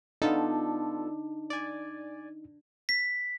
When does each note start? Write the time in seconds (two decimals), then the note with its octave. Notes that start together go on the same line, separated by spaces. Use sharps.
0.22 B3 D4 D#4 F4 A4
1.50 D5 G#5
2.89 B6